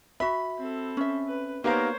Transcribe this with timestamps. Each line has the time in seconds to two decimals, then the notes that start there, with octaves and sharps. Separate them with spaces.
0.20 F#4 E5 B5
0.58 C4 A4
0.97 C#4 E5
1.28 B4
1.64 A#3 B3 D#4 G4 A#4 C5 C#5 F5